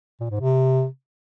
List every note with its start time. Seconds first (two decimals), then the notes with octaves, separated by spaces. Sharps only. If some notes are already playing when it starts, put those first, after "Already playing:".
0.20 A#2
0.31 G#2
0.41 C3